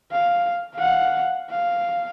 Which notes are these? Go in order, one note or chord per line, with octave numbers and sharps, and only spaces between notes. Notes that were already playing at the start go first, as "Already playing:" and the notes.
F5
F5 F#5
F5